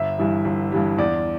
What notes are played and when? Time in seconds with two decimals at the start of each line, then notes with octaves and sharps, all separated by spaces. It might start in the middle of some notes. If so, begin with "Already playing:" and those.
Already playing: G1 E5
0.18 G2 E3 G3
0.45 G1
0.72 G2 E3 G3
0.98 E2 D5